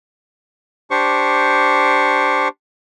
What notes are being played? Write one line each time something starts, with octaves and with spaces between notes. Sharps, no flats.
D4 G4 C5 C#6